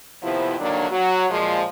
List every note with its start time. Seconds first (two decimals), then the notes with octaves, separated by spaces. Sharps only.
0.23 D#2 C3 F3 B3 C4 E4
0.60 G2 D3 D#3 F#3 A#3 D4
0.90 F#3
1.30 A#2 F3 G#3